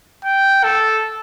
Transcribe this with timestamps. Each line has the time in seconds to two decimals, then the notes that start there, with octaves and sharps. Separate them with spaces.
0.25 G5
0.64 A4